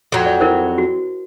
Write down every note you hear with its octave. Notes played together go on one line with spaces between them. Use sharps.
F2 F#3
D5
E4 A#4 C5
F#4